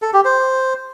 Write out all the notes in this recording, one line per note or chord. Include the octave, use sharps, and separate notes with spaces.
A4
G4
C5